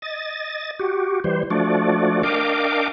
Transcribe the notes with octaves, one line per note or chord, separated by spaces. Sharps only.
D#5 A6
F#4 G4
E3 G3 C5
F3 A3 D4 F#4 D5
D4 A#4 D#5 F5 G5 D6